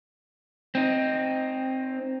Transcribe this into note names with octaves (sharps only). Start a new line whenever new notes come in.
C4 D#4